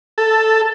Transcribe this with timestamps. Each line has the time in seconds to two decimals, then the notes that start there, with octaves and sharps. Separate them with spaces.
0.18 A4